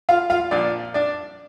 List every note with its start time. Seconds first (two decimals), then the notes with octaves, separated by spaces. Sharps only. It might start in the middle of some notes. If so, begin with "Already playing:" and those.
0.09 F4 F5
0.30 F4 F5
0.51 A#2 F3 D4 D5
0.94 D4 D5